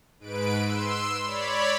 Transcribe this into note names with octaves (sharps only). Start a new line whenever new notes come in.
G#2 B4 D7
C6 E6
C#5 D5 B5